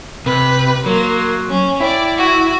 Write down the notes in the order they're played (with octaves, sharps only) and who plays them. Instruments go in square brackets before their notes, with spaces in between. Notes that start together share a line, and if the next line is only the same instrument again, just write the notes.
[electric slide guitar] C3 [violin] B4
[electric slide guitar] F#3 [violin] A#3 C6
[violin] C#4
[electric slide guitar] E4 [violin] D5 G5
[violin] F#4